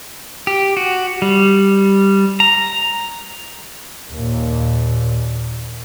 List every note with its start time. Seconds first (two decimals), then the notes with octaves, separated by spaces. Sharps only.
0.47 G4
0.77 F#4
1.22 G3
2.40 A#5
4.11 D#2 A#2